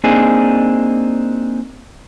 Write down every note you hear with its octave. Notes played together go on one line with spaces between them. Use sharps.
A#3 C4 D4 D#4 G#4